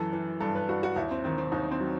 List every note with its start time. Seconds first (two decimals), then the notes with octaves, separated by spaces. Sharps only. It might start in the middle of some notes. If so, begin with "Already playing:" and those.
Already playing: F#2 E3 A4
0.13 E3
0.41 G2 A4
0.55 B4
0.69 G2 F#4
0.83 F#4
0.96 D#2 E4
1.11 C4
1.24 D#3 C4
1.38 C4
1.52 D#2 D#4
1.71 C4
1.80 F#3